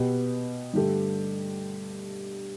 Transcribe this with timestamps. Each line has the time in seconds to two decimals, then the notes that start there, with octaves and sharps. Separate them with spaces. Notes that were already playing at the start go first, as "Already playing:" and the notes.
Already playing: B2 B3 G4
0.73 G2 D3 A3 G4